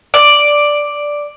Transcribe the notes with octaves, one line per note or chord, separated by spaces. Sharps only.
D5